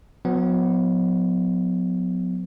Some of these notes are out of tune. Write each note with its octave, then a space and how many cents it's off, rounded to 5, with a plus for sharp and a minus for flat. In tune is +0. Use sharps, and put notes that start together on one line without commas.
F#3 -35 B3 +20